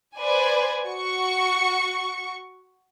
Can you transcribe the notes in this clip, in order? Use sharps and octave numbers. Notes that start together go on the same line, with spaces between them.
B4 C5 D5 G#5
F#4 C#6 C#7